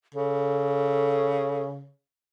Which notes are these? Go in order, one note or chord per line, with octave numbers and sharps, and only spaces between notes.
C#3 A4